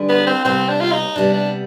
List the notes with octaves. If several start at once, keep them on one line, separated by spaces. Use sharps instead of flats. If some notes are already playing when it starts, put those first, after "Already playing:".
Already playing: D3 G3 D4 G#4 B4
B3
C4
C3 G3 B3 C4
D4
F4
D#4
C3 G3 B3 D4
D4